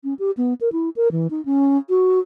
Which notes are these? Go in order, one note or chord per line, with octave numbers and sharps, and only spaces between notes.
C#4
G4
B3
A#4
E4
A#4
E3
D#4
C#4
F#4